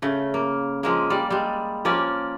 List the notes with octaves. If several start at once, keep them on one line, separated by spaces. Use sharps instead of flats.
C#3 A3
A#3
F3 G#3 A#3
G3 D5
G3 G#3
F3 A#3 C#4 D5